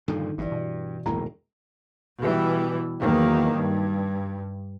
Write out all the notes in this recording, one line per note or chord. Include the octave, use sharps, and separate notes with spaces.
G2 A#2 D3 D#3 F3 A4
G#1 G2 E3 D5
B2
E1 A#1 D#2 A2 A#5
B2 E3 G3
E2 D#3 F#3 A#3
G2